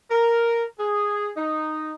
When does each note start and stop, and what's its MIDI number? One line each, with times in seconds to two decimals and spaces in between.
0.11 0.64 70
0.80 1.31 68
1.37 1.93 63